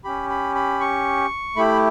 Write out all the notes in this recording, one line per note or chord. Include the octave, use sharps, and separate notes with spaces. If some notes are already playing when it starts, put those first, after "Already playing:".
C#4 G4 B5
B5
B5
C#6
A3 E4 G4 B5